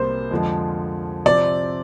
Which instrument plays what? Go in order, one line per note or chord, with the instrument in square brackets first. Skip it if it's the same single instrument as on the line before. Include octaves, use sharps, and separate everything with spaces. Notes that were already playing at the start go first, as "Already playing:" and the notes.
Already playing: [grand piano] C2 C3 G3 A#3 [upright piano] C5
[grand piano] F2 D3 F3 G#3
[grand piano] C3 F3 C4 [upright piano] D5